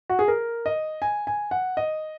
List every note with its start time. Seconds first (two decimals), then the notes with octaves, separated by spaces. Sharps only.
0.10 F#4
0.19 G#4
0.28 A#4
0.66 D#5
1.02 G#5
1.27 G#5
1.51 F#5
1.77 D#5